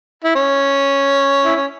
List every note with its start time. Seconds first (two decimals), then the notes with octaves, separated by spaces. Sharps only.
0.24 E4
0.35 C#4
1.45 E4
1.55 C#4